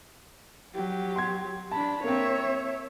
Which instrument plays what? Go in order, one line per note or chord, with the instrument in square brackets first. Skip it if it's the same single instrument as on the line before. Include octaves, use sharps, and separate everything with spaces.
[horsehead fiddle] F#3 G4
[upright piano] C6 G#6
[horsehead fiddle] D4 B5 [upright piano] A5
[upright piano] A#3 C4 [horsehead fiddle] C#5 E5